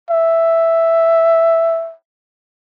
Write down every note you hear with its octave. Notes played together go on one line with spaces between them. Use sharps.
E5